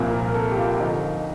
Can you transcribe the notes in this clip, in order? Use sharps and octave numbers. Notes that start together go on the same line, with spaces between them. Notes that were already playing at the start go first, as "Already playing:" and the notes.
Already playing: C2 A#2 F3
A#4
A#4
A4
G4
F4
D3 F3 D#4